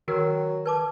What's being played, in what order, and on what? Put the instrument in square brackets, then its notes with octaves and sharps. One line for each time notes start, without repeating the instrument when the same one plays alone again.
[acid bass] D#3 [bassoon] F#3 [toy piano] F#4 A#4
[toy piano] B4 A5 D6